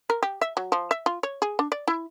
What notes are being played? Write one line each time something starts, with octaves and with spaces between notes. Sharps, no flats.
A#4
G4
E5
F#3
F3
E5
F4
C#5
G#4
D4
D5
E4